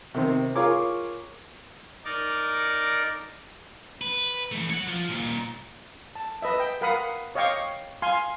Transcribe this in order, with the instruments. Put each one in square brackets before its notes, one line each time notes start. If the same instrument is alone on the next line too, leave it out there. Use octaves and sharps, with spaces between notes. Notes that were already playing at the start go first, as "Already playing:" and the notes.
[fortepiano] C3 D#3 C4
F4 G#4 A#4 C#5 D6
[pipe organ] D#4 A#4 D5
[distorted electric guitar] B4
E3 A3
C#5 F#5
F3 F4
A#2 D#3
[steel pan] A5
B4 D#5 E5
G5
A#4 F5 F#5 B5 D#6
C#5 D#5 F5 G5 C#6 D6
F5 G#5 C6